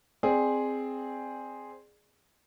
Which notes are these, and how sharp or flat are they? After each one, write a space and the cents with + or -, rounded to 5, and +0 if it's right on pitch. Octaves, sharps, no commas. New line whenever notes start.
C4 +0 G#4 +0 D5 +30